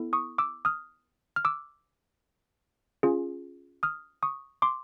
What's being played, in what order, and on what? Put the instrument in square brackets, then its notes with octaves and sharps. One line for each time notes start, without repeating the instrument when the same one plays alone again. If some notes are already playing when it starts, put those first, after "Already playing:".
Already playing: [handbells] B3 E4 A4
C#6 D#6
D6 E6
D#6 F6
F6
D6 E6
C#4 F4 G#4
D#6 F6
C#6 D#6
C6 D6